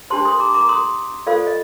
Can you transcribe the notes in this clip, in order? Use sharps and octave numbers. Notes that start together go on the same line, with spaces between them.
D4 G4 C5 A5 C6
C6 D#6
A#5 D6
A#5 D6
C6 D#6
F4 A4 C5 D5 F5
D#5